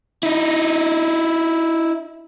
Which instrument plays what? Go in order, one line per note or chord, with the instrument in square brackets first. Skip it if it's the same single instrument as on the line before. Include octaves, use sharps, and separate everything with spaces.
[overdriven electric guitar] D#4 E4